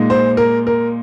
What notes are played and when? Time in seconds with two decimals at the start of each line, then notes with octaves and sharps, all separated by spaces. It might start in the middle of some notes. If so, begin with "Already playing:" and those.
Already playing: A#2 G#3 D#4
0.10 C5
0.37 A#4
0.67 A#4